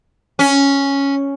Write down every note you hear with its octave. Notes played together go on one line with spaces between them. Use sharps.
C#4